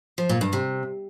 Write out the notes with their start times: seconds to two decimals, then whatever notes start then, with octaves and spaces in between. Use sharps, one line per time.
0.18 F3
0.29 A#2
0.41 G2
0.53 C3